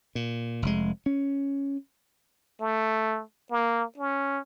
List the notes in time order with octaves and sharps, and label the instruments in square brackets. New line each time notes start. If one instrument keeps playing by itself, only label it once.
[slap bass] A#2
F1 G#3
C#4
[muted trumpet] A3
A#3
C#4